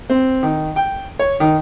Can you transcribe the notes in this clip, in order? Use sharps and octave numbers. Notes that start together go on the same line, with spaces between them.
C4
D#3
G5
C#5
D#3